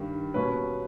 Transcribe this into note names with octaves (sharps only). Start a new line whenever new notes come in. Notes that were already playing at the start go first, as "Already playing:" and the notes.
Already playing: G2 D#3 G3
B2 G3 A#3 C#4 B4